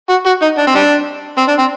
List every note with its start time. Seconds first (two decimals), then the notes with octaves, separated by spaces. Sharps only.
0.09 F#4
0.26 F#4
0.42 D#4
0.58 D4
0.67 C4
0.75 G3 D4
1.38 C4
1.48 D4
1.59 C4